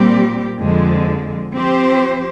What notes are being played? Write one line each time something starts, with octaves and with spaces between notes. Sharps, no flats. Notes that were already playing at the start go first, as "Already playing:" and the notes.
Already playing: A#2 G3 C4 G4
F2 D3 F3 G#3
F3 C4 G4 C5